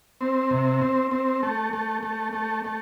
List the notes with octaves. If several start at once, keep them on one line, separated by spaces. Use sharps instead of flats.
C4
C3
C4
C4
A3
A3
A3
A3
A3